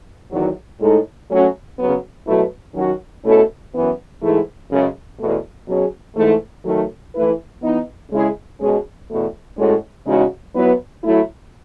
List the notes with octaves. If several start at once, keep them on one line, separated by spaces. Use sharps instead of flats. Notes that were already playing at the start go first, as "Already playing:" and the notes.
E2 D#3 F#3
A2 G#3 D#4 A4
F#3 A3 C#4 F#4
C#3 F#3 B3
B2 F#3 A3 E4 B4
D#3 F#3 C#4 F#4
B2 A3 C#4 E4 A4
F#2 E3 B3
G#2 E3 A3 E4 G#4
F#2 C#3 G#3 C#4
E2 B2 A3
B2 F#3 C#4 G#4
G#2 E3 A3
D#3 F#3 A3
E3 A3 E4 B4
E3 B3 D#4
C#3 G#3 C#4 E4 G#4
B2 G#3 C#4 G#4
E2 B2 A3
A2 G#3 C#4 F#4 A4
E2 C#3 G#3 D#4 F#4
F#3 B3 E4 B4
F#3 A3 E4